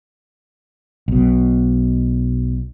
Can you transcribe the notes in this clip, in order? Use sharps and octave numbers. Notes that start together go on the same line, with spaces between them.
B1 B2